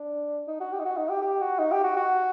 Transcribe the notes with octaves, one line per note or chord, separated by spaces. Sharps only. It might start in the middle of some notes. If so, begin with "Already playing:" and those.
Already playing: D4
D#4
F#4
G4
D#4
F#4
D#4
G4
G4
F#4
D#4
G4
F#4
F#4